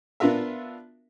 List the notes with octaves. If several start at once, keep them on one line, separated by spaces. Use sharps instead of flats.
B3 D4 F4 A#4 E5